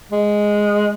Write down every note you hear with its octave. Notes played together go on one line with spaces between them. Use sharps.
G#3